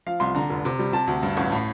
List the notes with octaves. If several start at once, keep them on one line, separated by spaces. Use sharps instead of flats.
F3 F5
C2 C6
D3 A#5
F1
C3
G3
C3 A5
D2
G2
A1
A2